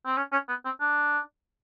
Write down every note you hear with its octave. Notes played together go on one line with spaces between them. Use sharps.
C4
C#4
C#4
B3
C4
D4